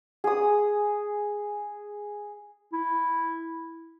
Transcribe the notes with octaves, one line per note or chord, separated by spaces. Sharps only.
G#4 D#6
E4